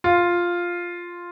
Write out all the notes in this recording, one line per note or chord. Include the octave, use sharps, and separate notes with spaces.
F4